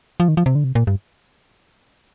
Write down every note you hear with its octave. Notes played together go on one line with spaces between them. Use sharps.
F3
D#3
F3
C3
D3
C3
A#2
G2